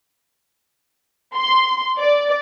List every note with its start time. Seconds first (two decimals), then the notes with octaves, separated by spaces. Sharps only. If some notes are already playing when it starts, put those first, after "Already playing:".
1.36 C6
1.99 D5